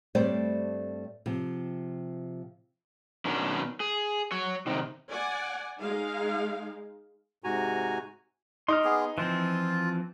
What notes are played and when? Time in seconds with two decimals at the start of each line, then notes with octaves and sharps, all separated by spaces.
0.15 G2 G3 A3 C4 C5 D5
1.26 C3 F3
3.25 B2 D#3 C#4 D4
3.80 G#4
4.32 F#3 C#5
4.67 C3 D#3
5.08 D5 F#5 G#5
5.80 G#3 D#4 G#4 F5
7.44 G#2 C3 F#4 G#5 A#5
8.68 D#4 C6 D6 F6
8.84 B3 G#4
9.18 E3 F3 C4 F4